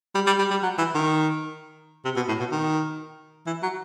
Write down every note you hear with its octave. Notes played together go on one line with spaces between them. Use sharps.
G3
G3
G3
G3
F#3
E3
D#3
C3
B2
A2
B2
D#3
E3
F#3